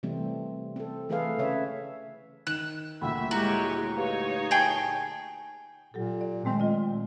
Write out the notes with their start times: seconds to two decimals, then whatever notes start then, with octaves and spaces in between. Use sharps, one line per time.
0.03 C3 E3 G3 A3 C4
0.76 C4 A4
1.09 E3 A3 G#4 A4 B4 F5
1.39 C#3 B4 C#5 E5
2.47 D#3 F#6 E7
3.01 D2 A#2 G3 E5 F#5 G5 B5
3.31 G#3 E4 F#4 G4 C#5 A#5
3.97 D#4 G4 B4 C#5 F5
4.51 G#4 G5 A5
5.94 A#2 F#3 G4 A4
6.21 D5
6.45 D#3 G#3 A3 C4
6.59 A#2 F4 D#5 G5